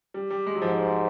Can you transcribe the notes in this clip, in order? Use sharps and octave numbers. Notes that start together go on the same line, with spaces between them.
G3
G3
G#3
F#3
G#2 F3